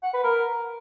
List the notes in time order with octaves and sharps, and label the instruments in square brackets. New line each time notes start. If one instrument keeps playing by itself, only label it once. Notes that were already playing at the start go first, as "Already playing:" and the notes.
[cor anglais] F#5
B4
A#4